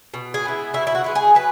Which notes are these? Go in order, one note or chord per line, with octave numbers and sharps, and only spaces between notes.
B2
G#4
G#3 B3 E4
B2 E4
E4
F#4
G#3 B3 E4
G#4
F#3 B4